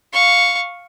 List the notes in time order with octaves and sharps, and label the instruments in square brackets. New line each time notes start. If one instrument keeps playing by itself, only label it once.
[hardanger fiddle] F5 C#6